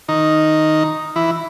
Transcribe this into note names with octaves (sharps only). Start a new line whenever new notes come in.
D#3 D#4
E3 E4